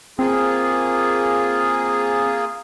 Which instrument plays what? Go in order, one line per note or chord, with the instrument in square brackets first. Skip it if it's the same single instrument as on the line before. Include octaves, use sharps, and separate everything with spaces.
[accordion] A#3 F4 G#4 [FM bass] C4